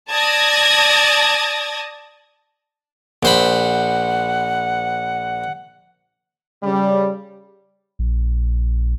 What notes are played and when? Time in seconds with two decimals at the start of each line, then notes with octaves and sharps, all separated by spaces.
0.10 D5 A5 D#6 G#6 A#6
3.23 A#1 C5 F#5 B5
6.63 C#3 G3
7.99 A#1